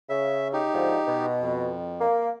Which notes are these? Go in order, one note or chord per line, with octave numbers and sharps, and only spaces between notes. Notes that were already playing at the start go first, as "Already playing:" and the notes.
C#3 E5
D#4 G4
G#2 D3 F3
B2
F2
A#3